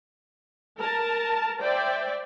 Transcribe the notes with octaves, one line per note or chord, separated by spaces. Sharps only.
A#4 A5
C5 D5 E5 G5